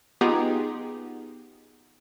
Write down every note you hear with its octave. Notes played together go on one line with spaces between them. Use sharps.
B3 D#4 F4 G4 G#4